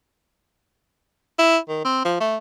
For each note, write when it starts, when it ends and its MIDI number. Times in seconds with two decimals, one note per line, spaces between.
1.39 1.58 64
1.68 1.84 51
1.84 2.03 60
2.05 2.17 53
2.20 2.37 57